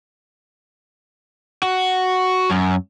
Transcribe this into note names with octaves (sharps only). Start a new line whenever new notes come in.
F#4
F#2